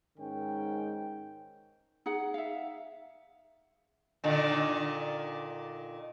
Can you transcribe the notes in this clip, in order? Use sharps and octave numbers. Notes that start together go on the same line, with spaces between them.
G#2 D#3 C#4 G5
D#4 G#4 F#5
E5 F5
A#2 D3 D#3